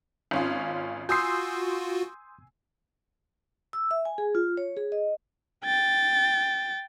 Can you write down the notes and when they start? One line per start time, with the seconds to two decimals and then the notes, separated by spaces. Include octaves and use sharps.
0.31 G#1 C#4 F4
1.09 F4 F#4 G#5 C6 D#6 E6 G6 C7
3.73 E6
3.91 E5
4.05 G#5
4.18 G#4
4.35 F4
4.57 C#5
4.77 G#4
4.92 D#5
5.65 G5 A6